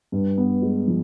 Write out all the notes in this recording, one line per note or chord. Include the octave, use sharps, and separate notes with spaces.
G2
B3
G#3
F3